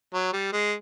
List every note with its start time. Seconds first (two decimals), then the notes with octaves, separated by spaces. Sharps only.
0.14 F#3
0.33 G3
0.52 G#3